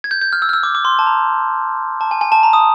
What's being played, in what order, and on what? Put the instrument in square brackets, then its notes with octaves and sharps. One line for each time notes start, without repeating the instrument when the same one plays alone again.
[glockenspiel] G#6
G6
G6
F6
E6
F6
E6
D6
D6
C6
A5
A#5
A5
G#5
G#5
A5
A#5
D#6